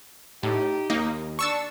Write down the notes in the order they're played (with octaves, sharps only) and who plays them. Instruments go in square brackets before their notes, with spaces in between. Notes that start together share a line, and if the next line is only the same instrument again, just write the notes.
[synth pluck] A2 [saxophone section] D#4 G4
[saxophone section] D#2 [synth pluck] A#3 D#4
[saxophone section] D4 [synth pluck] C#6 E6 A6